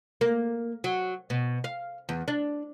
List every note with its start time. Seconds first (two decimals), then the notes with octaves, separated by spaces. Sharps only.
0.21 A#3
0.84 F#3
1.30 B2
1.64 F5
2.09 E2
2.28 D4